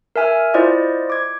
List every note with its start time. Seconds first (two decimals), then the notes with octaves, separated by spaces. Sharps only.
0.16 A#4 E5 G#5 F6
0.54 E4 F4 C5 D5 D#5
1.10 D6 G#6